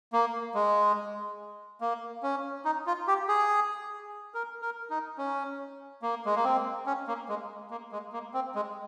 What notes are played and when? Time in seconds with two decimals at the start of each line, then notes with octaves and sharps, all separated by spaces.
0.13 A#3
0.55 G#3
1.81 A#3
2.23 C#4
2.65 D#4
2.87 F4
3.07 G4
3.28 G#4
4.34 A#4
4.62 A#4
4.90 D#4
5.18 C#4
6.02 A#3
6.25 G#3
6.35 A#3
6.44 C4
6.87 C#4
7.07 A#3
7.29 G#3
7.70 A#3
7.92 G#3
8.13 A#3
8.34 C4
8.55 G#3